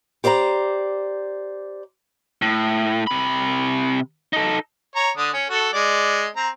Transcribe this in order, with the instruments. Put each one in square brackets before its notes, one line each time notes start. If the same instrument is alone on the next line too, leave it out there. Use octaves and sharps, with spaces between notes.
[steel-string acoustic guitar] G4 C5 D5 F5 A#5
[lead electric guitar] A2
C3 B5
D#4 A4
[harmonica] C#5 A#5
D3 D4 D#6
C#4
F#4 A4
G#3 D5
C4 A#5